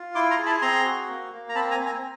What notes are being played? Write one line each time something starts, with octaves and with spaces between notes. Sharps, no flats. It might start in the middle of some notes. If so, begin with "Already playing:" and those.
Already playing: F4
E4 C6 D6
A#5 C6
G#4
A5 B5
C4 A#5 C6
F#4
A#3
A#3
A#5
C4 A5 B5
G#5 A#5
C4
G#5 A#5